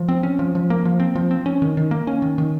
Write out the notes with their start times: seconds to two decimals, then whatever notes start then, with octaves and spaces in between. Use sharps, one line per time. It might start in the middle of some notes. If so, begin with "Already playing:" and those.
Already playing: F3
0.09 C4
0.23 C#4
0.39 F3
0.55 F3
0.70 A#3
0.85 F3
1.00 C4
1.15 F3
1.31 C4
1.46 C#4
1.62 D#3
1.77 D#3
1.91 A#3
2.07 C#4
2.22 D#3
2.38 D#3